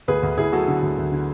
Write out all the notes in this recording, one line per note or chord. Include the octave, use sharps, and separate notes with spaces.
D2 G#4 B4
D2
D2 E4 G#4
F#3 F#4 A4
D3
D2
D2
D3